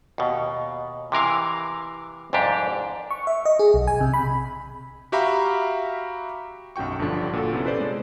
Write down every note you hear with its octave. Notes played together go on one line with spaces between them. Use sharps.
D#2 B2
C3 E3 A#4 F5
C2 F2 G#2 D4 G4
C#6
E5
D#5
G#4
B1
G#5
C3
B5
F#4 G4 E5 F5 A#5 B5
B1 F#2 F#4 G5 C#6
G1 G2 D3 F3 D4
A#2 F#4 A4
C3 B3 C#4 E4
A4 B4 C5 D5
G#3